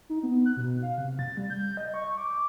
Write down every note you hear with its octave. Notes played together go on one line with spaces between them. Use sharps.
D#4
B3
F#6
B2
F5
C3
A6
G3
G6
D#5
C#6
D6